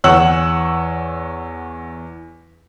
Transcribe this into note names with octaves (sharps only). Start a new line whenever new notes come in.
E2 C#5 F#5 E6 F#7